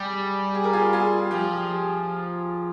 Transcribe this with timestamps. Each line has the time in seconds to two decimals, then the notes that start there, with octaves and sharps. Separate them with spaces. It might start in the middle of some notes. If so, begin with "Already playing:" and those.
Already playing: G3 G4 G#4
0.55 G#4
0.64 A#4
0.73 F4 G#4
0.93 F4 G#4
1.31 F3 G4